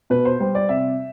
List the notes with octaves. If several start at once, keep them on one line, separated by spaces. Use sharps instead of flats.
B2 B4
C5
G3 C5
D5
C3 E5